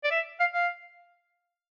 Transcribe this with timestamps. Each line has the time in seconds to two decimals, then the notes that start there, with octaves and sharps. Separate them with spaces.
0.04 D5
0.11 E5
0.40 F5
0.54 F5